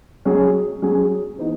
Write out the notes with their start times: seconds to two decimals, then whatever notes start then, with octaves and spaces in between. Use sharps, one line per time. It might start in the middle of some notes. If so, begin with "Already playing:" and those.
0.25 F#3 C#4 G#4
0.82 F#3 C#4 G#4
1.38 E3 B3 D#4 F#4